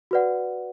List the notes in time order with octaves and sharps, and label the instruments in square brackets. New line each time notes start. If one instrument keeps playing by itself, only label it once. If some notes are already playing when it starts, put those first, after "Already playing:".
[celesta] F#4 B4 D5 F#5